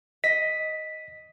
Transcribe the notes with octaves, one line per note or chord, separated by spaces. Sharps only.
D#5 B6